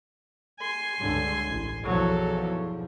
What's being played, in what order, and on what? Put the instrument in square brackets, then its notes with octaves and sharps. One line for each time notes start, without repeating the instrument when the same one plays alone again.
[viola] G#5 C6
[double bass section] C#2 G2 D3
A1
[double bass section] B1 E2 F3 [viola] F#3 A4